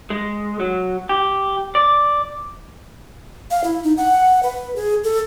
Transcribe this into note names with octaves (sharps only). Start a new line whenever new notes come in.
G#3
F#3
G4
D5
F5
E4
D#4
F#5
B4
G#4
A4